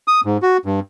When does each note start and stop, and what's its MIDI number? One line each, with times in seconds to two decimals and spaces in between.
0.08 0.21 87
0.25 0.37 44
0.43 0.57 66
0.66 0.80 43